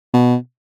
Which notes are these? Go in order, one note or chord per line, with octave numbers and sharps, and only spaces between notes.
B2